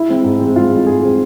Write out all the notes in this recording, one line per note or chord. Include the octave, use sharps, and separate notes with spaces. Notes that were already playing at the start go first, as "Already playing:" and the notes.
Already playing: E4
G#3 C4
G#2
G#3 C4
G#2 F4
G#3 C4
G#2 G#4
G#3 C4